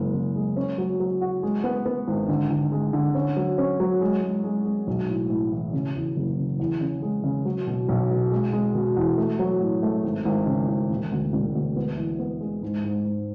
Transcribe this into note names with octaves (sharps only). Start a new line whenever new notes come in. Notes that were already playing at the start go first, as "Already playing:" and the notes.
Already playing: F#1 G#3
F#1
G#3
C#4
F#3
F#3
F#4
G#3
B3
B3
G#1
D3
D3
G#3
D3
C#4
F#3
C#4
F#3
G#3
G#3
G#3
G#3
B1
A2
A2
E3
C#3
E2
F#1
C#3
E2
C#3
G#3
C#3
F#3
B2
B1
B2
G#3
G#3
B2
E2
A3
F#3
A2
A3
G#1
G#1
C#3
G#1
E1
D2
E1
D2
B3
E3
B3
G#3
G#2
G#2
G#2